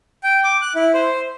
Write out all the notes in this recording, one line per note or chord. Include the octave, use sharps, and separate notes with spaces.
G5
D6
F#6
E4
C5